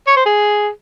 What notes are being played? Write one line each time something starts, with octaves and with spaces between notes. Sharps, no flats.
C#5
C5
G#4